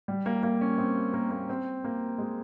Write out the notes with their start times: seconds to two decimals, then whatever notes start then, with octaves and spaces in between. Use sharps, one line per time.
0.08 G3
0.26 A#3
0.43 A#3
0.61 C#4
0.78 C4
1.14 A#3
1.31 A#3
1.49 C4
1.84 A#3
2.18 G#3